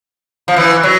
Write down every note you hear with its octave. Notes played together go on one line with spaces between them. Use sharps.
F3
E3
F#3